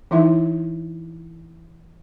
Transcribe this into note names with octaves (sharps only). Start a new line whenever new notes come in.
E3 D#4 E4 E5 C6